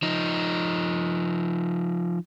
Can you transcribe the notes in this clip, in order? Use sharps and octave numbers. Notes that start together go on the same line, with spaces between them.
F3 D#4